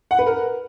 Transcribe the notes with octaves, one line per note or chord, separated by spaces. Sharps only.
F#5
B4
A#4